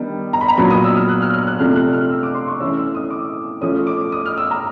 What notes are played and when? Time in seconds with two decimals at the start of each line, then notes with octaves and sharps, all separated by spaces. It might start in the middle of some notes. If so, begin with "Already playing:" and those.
Already playing: D#3 G3 B3 D4
0.33 A#5
0.41 B5
0.48 A#5
0.57 A#2 F#3 B3 D4 B5
0.71 D#6
0.84 E6
0.96 F6
1.09 F#6
1.22 F6
1.34 F6
1.47 F#6
1.59 C3 F3 A3 D4 F6
1.76 F#6
1.93 F6
2.10 E6
2.23 D6
2.35 C6
2.48 C#6
2.60 E3 A3 C#4 E6
2.77 E6
2.95 D#6
3.11 D6
3.61 F3 A3 C#4 D#6
3.87 D6
4.12 D#6
4.26 F6
4.38 E6
4.51 A#5